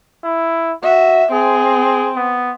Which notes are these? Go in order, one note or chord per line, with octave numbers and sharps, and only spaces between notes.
E4
F#4 E5
C4 G#4
B3